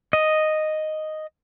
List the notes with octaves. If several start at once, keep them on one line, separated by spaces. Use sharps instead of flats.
D#5